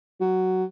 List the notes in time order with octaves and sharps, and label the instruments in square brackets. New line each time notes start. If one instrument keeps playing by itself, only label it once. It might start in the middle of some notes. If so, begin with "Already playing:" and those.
[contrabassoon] F#3